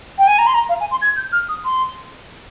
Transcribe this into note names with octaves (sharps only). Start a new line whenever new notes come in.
G5
G#5
A#5
C6
A#5
F5
G#5
C6
G#6
G6
F6
D#6
C6